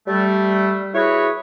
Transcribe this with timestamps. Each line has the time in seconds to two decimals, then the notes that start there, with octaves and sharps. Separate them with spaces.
0.08 G3 A3
0.94 E4 F#4 G#4 B4 C#5